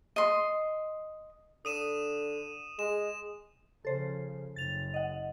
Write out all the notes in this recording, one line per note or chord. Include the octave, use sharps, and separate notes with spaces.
D#5 C6
D3 D#6 D#7 E7
G#3 E7
C#3 F3 A4 C5
F#1 A6 F7
D#5 F#5